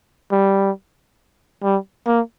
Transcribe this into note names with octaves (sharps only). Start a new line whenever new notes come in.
G3
G3
A#3